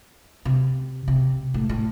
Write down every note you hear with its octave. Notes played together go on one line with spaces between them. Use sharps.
C3
C3
A2
A2